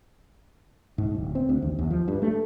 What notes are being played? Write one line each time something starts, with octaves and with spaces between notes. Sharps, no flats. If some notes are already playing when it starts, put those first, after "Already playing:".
G#2
D1
C4
D2
D#2
D#2
F3
G2
A3